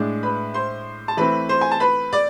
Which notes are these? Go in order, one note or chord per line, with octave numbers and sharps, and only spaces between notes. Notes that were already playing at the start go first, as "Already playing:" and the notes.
Already playing: A2 G#3 D4
B4 B5
C5 C6
A5
E3 A3 C4 B4 B5
C5 C6
G#5
A5
B4 B5
D5 D6